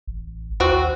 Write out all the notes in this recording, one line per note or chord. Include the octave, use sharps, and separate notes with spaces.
A1
D#2 C4 F#4